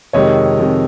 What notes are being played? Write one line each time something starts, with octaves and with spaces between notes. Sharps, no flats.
F2 C3 D#3 G#3 C#5 D#5
F2 C3 D#3 G#3